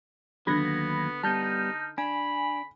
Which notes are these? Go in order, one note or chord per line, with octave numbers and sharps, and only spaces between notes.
D#2 D3 F#3 B3 B5 G#6 A#6
G3 B3 D#4 A5 F6 G6
D4 G#5 B5